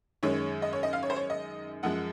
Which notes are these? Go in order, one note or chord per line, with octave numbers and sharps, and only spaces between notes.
F#2 D#3 G#3 C#5
D#5
C#5
D#5
F5
C#5
C5
C#5
D#5
F#2 F3 G#3 F#5